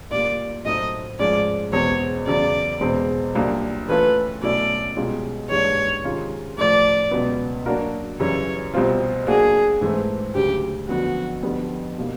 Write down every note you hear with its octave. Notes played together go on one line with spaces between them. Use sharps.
A#2 G3 A#3 D5
A2 F#3 A3 C4 D#4 D#5
G#2 F3 G#3 C#4 D5
E2 B2 G#3 C4 C#5
E2 C#3 F#3 D5
E2 B2 G#3 C4
C2 A#2 F#3 A#3 D4
E3 A3 C#4 F4 A4 B4
B2 F#3 A3 C#4 E4 D5
C2 B2 G#3 C#4 F4
G#2 E3 G3 A#3 D4 C#5
C3 D#3 G#3 C#4 F4
A2 F3 A3 D5
C#2 B2 F#3 B3
F#3 A#3 D4 F#4 A#4
F#2 C#3 E3 G3 C#5
C2 B2 G3 C4 F4
F#3 A#3 D4 F#4 G#4
G#2 E3 A3 C4
D2 C#3 F#3 G4
F2 D3 F#3 B3 F#4
F2 D3 G3 B3
B2 G3 A#3 D#4